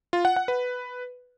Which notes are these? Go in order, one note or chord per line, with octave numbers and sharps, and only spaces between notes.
F4
F#5
F#5
B4